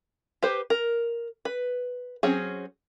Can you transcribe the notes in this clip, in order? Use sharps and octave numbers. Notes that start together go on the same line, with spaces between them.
G4 B4 C5
A#4
B4
F#3 C4 C#4 G#4